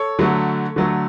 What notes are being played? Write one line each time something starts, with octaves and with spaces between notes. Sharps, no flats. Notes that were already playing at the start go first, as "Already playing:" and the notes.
Already playing: A4 C#5
D3 F#3 A3
D3 F#3 A3